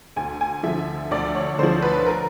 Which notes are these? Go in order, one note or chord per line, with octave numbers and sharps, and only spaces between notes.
D2 G#5
G#5
D3 F3 E5
D2 D5
C#5
D3 F3 C5
B4
A#4